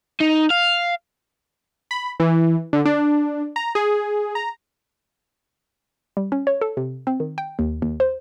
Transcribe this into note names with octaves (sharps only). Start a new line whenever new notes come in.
D#4
F5
B5
E3
D3
D4
A#5
G#4
A#5
G3
C#4
C#5
A4
C3
C4
D#3
G5
D#2
D#2
C5